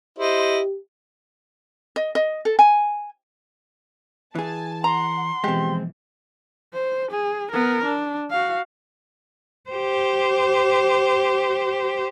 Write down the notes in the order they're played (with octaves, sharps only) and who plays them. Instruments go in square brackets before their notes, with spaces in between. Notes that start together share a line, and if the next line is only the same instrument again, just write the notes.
[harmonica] E4 C5 D#5 [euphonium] G4
[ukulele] D#5
D#5
A4
G#5
[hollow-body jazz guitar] E3 G#4 [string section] G#5 A5
[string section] F#5 [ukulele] A#5 [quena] C6
[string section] B2 E3 F3 [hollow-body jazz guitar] G#3 C4 [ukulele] G4
[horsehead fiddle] C5
G#4
B3 A#4
D4
F#4 F5
[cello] G4 C5